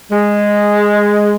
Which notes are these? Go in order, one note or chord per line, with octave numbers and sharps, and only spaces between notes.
G#3